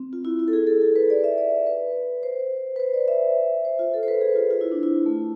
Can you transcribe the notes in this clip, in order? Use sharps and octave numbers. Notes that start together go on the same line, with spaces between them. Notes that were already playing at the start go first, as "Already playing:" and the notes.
Already playing: C4
F4
E4
E4
A4
G#4
A4
A4
B4
D5
E5
D5
B4
C5
B4
C5
D5
E5
C5
F4
A4
C5
B4
G#4
F4
F4
E4
D4
E4
A3